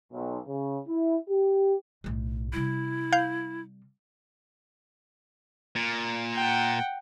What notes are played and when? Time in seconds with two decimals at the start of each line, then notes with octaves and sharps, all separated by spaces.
0.12 B1
0.48 C#3
0.88 E4
1.29 G4
2.04 B1 A2
2.53 C3 G3 E4
3.13 F5 G6
5.76 A#2
6.35 F#5 G5